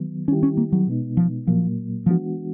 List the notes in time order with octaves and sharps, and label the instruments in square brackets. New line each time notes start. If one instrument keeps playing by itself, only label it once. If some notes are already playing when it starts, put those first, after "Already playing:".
Already playing: [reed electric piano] D#3 F#3 B3
[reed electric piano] D#3 G3 C4 E4 G4 [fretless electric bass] C#4
[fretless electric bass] C#4
A#3
F#3
[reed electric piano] B2 G#3 B3 D#4
[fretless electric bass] F3
[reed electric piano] A#2 F#3 A#3 [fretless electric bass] F3
[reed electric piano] E3 G#3 B3 D4 F#4 [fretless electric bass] F3